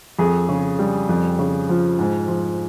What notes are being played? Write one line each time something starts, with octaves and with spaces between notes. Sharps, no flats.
F2 G#4
C#3
G3
F2
C#3
F3
G#2
F3